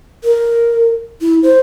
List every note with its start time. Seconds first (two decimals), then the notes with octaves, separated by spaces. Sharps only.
0.24 A#4
1.21 E4
1.43 C5